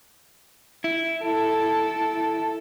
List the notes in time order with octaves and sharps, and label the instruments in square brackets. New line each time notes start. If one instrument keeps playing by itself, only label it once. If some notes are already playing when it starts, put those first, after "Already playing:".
[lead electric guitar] E4
[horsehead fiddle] A4